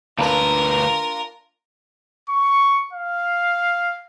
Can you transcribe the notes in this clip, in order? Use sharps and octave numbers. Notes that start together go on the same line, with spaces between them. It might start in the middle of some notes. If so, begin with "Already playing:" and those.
D2 A#3 D4 F4 A#4 B4 A#5
C#6
F5